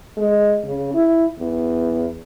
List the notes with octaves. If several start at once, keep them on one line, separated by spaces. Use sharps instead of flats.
G#3
C#3
E4
E2